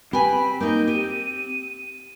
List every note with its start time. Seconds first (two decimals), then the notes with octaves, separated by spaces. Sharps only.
0.13 C4 G4 B4 G#5 B5
0.61 A#3 D#4 G6
0.88 G4 D#7